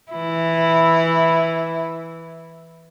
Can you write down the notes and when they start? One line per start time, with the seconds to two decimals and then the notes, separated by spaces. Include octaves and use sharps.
0.12 E3 E4